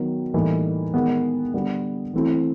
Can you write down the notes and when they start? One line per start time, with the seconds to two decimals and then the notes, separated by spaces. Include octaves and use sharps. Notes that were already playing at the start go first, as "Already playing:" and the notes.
Already playing: D#3 F#3 B3
0.34 A2 E3 G3 A#3 D#4
0.94 D#3 G#3 B3
1.54 D3 G3 B3
2.13 E3 A3 C4 E4